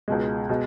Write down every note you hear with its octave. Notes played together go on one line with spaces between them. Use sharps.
C#2 B2 G#3
B2 G#3